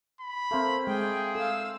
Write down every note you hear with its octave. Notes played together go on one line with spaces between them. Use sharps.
B5
A3 A#3 C4 A4 C5
G#3 G#4 G5
A4 F5 E6